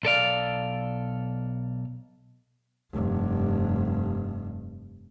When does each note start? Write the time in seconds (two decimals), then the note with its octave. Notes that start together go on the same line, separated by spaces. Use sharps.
0.03 B1 A4 D5 F5
2.92 F1 G2